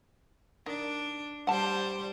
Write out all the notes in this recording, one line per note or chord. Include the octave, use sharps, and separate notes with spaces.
D#3 D4
G3 C5 F#5 A5